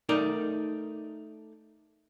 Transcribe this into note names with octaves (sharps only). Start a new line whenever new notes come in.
A3 D#4 A#4 D5